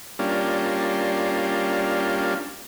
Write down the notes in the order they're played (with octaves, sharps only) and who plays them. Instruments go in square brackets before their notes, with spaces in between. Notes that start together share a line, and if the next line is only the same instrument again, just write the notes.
[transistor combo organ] G3 A#3 C#4 D4 F4